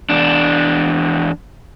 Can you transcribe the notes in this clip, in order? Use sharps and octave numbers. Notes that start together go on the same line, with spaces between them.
E2 D4